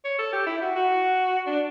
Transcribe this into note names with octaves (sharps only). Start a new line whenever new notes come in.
C#5
A4
G4
E4
F#4
F#4
D4